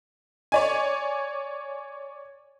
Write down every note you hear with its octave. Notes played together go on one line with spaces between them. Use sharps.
C#5 D5 G#5